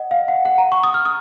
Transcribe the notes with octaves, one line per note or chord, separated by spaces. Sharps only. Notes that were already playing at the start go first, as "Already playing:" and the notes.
Already playing: D#5 F#5
F5
F#5
F#5
A#5
C#6
D#6
F6
D#6